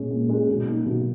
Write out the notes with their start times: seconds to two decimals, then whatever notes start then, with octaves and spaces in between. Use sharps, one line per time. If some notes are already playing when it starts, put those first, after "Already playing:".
Already playing: A#2 G#3 C#4 G#4
0.11 A#2
0.29 G#3 C#4 G#4
0.49 B1
0.66 B2 A#3 D#4
0.86 B1